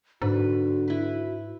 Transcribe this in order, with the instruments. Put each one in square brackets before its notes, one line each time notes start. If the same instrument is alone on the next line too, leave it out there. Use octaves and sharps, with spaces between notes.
[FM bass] G#2 [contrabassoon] D3 [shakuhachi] F#4 [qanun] B4
[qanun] E4 B4